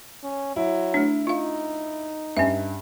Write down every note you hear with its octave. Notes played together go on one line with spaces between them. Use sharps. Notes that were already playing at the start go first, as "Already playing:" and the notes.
C#4
F#3 E4
A3 D4
D#4 F4 F5
G2 C#4 E5